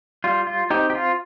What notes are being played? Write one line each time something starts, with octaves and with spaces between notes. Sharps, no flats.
G3 F4
F4
C4 D#4 G4
G4
F4